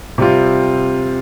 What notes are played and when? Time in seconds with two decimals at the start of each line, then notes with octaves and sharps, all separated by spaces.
0.18 C3 G3 C4 F4